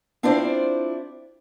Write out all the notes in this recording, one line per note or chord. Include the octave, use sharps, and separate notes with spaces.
C4 D4 E4 F4 C5 D5